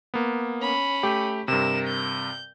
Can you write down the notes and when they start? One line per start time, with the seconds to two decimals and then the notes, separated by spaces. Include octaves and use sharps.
0.14 A#3 B3
0.62 C#4 B5
1.03 A3 G4
1.48 G2 C3 A#4 E7
1.87 G6